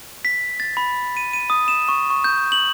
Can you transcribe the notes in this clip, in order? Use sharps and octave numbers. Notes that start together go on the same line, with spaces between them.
B6
A6
B5
D#7
D#7
D#6
E7
C#6
C#6
G6
F#7